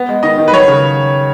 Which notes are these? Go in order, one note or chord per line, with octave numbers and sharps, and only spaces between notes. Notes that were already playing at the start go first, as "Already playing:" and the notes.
Already playing: B3
G#3
D#3 D#5
D#3
B4
F#3 C#5
C#3